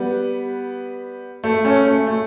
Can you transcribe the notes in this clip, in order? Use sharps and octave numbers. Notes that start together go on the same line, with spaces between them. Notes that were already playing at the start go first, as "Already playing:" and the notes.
Already playing: G3 B3
A3
A3 C#4
A3
A3